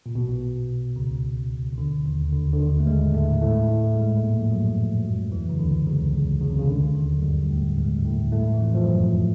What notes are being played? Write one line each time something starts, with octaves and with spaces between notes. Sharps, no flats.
A#2
B1 B2
C#2 C#3
D#3
D2 D3
D#2 D#3
C#3
D2 D3
D3
D#2 D#3
A3
G#2 G#3
A2 A3
A2 A3
A2 A3
G#2 G#3
A#2 A#3
F3
F#2 F#3
F2 F3
F#2 F#3
E2 E3
C#3
D2 D3
C#2 C#3
C#2 C#3
C#3
C3
C#2 C#3
D2 D3
D#2 D#3
F#3
G2 G3
A2 A3
G#2 G#3
A2 A3
A2 A3
E3
F2 F3
F3
F#2 F#3